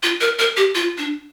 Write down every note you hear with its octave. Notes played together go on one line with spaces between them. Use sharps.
F4
A#4
A#4
G4
F4
D4